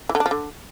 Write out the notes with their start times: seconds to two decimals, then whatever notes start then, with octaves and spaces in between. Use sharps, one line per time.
0.09 E3
0.15 D3
0.20 D4
0.26 F3
0.31 D3